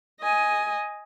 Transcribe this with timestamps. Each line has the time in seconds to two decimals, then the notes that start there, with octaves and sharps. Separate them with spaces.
0.21 D#5 G#5